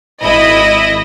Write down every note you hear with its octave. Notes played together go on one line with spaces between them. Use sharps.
G#1 E4 D#5